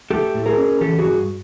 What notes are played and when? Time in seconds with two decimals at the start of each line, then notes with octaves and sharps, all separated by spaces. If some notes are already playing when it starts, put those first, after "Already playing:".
0.11 A3 G4 A4
0.34 A2
0.46 G#4 A#4
0.58 C#4
0.81 E3 G4 A4
0.99 F#4 G#4
1.05 G2